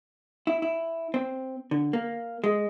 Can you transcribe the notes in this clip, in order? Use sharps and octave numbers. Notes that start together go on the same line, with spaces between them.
E4
E4
C4
D3
A#3
G#3